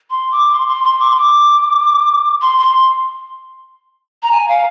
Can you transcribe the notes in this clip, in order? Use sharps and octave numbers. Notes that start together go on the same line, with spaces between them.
C6
D6
C6
C6
C6
D6
C6
D6
C6
C6
A#5
G#5
F5